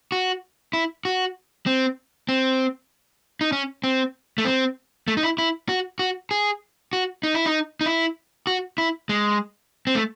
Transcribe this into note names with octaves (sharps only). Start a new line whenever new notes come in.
F#4
E4
F#4
C4
C4
D#4
C#4
C4
A3
C4
A3
D#4
E4
E4
F#4
F#4
G#4
F#4
D#4
E4
D#4
D#4
E4
F#4
E4
G#3
C4
A3